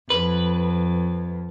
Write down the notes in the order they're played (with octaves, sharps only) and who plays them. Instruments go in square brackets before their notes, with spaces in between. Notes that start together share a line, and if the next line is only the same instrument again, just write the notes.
[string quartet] F2 [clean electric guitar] B4